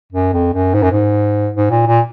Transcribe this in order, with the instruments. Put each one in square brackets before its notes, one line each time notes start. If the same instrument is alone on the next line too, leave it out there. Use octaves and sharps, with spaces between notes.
[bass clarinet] F#2
F2
F#2
G#2
F#2
G#2
G#2
A#2
A#2